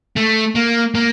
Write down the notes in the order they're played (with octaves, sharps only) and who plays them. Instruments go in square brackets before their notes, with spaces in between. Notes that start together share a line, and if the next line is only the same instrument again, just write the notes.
[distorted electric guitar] A3
A#3
A#3